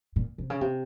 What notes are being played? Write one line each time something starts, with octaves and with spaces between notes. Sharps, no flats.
A#2
C3
C#3
C3